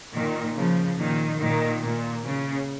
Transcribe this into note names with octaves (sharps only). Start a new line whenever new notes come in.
A#2 D#3
C#3 F3
A#2 D#3
A#2 D#3
A#2
C#3